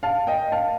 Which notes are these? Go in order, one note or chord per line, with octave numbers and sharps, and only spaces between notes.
F5 A5
D#5 G5
F5 A5